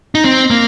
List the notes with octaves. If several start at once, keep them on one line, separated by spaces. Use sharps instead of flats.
D#4
C4
A#3